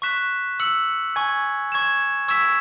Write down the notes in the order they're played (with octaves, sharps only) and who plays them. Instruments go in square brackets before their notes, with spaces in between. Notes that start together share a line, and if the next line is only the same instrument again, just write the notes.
[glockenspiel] C#6 F#6 B6 E7
E6 C#7 F#7
G#5 C#6 G#6
C#6 G#6 E7
C#6 E6 G#6 B6 E7